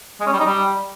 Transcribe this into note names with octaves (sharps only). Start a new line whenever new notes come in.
G#3
C#4
G3
D#4
G3